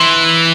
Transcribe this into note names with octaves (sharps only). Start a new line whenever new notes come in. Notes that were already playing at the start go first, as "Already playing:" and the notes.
Already playing: E3 C6